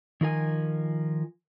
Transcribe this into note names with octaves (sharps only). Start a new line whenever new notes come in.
D#3 F3 A#4 G#5